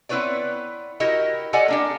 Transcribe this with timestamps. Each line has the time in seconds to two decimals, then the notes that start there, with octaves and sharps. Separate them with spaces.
0.09 B3 C4 E4 B4 C#5 D5
1.00 E4 F#4 G4 A#4 D#5
1.53 G4 A4 D5 D#5 F#5 G#5
1.68 A#3 D4 G4